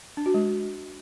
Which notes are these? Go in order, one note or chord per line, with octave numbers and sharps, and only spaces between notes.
D4
F#4
G#3